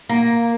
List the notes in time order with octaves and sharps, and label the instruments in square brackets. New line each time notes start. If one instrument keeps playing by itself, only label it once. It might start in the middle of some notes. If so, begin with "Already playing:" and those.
[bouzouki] A#3